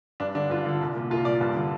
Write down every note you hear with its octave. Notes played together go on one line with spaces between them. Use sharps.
G2 D4
D3 D4
G2 F4
D3
C2
A#2
C2 F4
A#2 D5
G2
D3